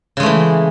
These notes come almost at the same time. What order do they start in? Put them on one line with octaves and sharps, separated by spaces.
C#3 G#3 A3 E3